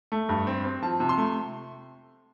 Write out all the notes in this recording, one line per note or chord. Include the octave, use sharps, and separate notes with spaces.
A3
G2
C4
C4
F3 A5
C3
C6
A3